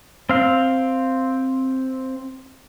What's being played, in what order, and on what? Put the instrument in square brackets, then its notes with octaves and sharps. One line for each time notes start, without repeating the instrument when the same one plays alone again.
[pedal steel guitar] C4 F5